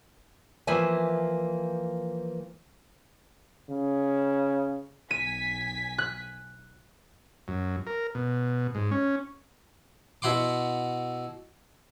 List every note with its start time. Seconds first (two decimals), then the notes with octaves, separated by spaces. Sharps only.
0.67 E3 F3 A#3 E5 G#5
3.70 C#3
5.11 B1 G#5 B6 D#7
5.98 F#6
7.48 F#2
7.87 A#4
8.15 B2
8.75 G#2
8.91 C#4
10.22 B2 E4 F#5 C6 D6